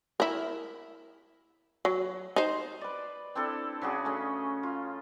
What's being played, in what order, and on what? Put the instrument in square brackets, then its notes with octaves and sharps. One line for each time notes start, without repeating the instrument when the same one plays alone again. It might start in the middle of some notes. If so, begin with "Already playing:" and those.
[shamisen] E4 A#4
F#3
D#4 C5
[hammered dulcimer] B4 D5
C4 D4 E4 A4
C#3 D4 F#4 G#4
A3 C#4 D#5
F4